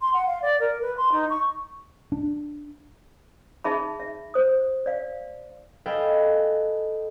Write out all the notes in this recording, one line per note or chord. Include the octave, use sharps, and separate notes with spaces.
C6
F#5
F5
D5
A#4
B4
C6
D#4
C#6
D4
D#4 G#4 E5 A5 B5
E5
C5 D#6
D5 F5
A4 B4 D#5 F5 G5 G#5